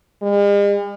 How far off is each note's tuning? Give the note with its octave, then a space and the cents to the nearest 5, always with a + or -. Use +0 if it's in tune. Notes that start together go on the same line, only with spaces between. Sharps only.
G#3 -45